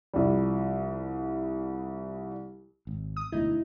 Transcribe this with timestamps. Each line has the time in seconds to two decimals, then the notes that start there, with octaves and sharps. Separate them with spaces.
0.13 C2 F3 G3
2.87 G#1
3.16 D#6
3.32 E1 D2 D#4 E4